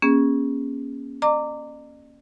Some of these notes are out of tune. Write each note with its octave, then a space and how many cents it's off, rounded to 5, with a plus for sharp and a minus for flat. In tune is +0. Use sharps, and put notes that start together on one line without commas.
A#3 +35 C#4 +0 G#4 -20
D5 +45 A#5 -25 D6 -5